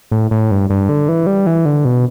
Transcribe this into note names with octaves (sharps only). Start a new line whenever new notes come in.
A2
A2
G2
G2
D3
E3
G3
E3
D3
B2